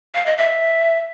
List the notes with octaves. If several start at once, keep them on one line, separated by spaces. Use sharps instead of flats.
F5
D#5
E5